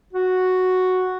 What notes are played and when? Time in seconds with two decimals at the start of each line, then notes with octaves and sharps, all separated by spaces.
0.13 F#4